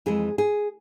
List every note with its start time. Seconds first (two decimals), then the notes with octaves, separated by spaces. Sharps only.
0.06 F2 E3 G#3 G#4
0.38 G#4